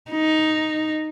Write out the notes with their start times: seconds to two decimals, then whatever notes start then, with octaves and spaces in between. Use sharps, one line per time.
0.12 D#4